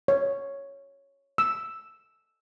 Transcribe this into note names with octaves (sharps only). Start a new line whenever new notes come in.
C#5
E6